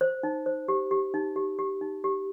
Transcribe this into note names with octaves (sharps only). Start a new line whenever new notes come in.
C5
D#4
C5
G4
G4
D#4
G4
G4
D#4
G4